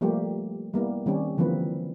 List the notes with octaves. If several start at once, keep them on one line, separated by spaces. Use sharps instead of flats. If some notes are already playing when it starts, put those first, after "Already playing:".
F3 G3 A3 A#3 G4
G3 A#3 B3 E4
D#3 G3 C4 C#4
D3 E3 F3 A#3 C4 B4